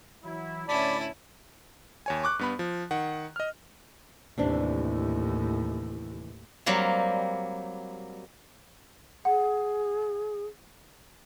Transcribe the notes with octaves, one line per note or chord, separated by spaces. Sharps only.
E3 F#3 E4
D2 A2 C#4 E4 D5 A5 B5
D#2 C#5 G#5
C#6 D6 F#6
G2 B3 B5
F3
D#3 F#5
D#5 F6
D#2 A2 C3 E3 D4
F#3 G3 A#3 C4
G#4 F#5